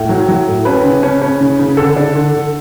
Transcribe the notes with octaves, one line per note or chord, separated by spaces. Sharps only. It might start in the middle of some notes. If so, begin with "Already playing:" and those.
Already playing: A2
F#3
F#3
A2
C#4 B4
C#3
C#4
C#4
C#3
C#3
D3 A4
D4
D3
D3